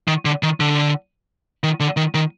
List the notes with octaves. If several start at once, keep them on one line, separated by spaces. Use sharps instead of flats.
D#3
D3
D#3
D3
D#3
D3
D#3
D#3